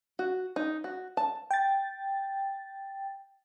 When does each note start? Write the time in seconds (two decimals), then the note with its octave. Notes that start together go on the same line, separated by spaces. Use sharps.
0.19 F#4
0.56 D#4
0.84 F#4
1.17 A5
1.51 G5 A6